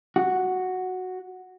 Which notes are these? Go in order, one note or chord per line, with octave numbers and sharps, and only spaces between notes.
F#4